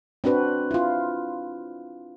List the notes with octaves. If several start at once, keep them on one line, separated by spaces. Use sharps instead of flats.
C4 D4 F#4 B4
E4 F4